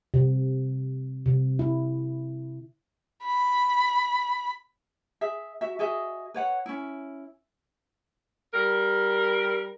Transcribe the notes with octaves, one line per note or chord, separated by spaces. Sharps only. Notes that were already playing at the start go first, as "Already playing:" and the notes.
C3
C3
E4
B5
G#4 E5
F#4 E5
F#4 G#4 D#5 E5
B4 C#5 F#5
C#4 E4
G3 A#4